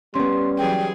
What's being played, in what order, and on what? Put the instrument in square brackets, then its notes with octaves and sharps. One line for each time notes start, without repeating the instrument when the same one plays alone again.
[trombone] G3 [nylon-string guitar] B3 C#4 [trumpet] C6
[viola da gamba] E3 F#3 G#4 [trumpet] G5